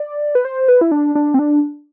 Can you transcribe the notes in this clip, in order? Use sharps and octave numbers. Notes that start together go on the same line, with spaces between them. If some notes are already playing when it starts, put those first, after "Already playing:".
Already playing: D5
B4
C5
B4
E4
D4
D4
C4
D4